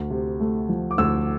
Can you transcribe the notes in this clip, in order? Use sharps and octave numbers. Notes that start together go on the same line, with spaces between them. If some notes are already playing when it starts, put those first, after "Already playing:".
Already playing: D2
C3
A3
F3
D6
D2 E6